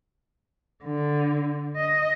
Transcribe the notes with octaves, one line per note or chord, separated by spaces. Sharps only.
D3
D#5